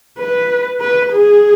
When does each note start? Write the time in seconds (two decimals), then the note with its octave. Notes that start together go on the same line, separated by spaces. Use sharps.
0.19 B4
0.81 B4
1.13 G#4